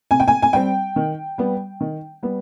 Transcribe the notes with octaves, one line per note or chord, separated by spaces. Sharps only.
C3 G#5
G5
G#5
G#5
G3 C4 G5
D#3
G3 B3
D#3
G3 B3